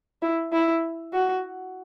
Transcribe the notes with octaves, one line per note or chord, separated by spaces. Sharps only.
E4
E4
F#4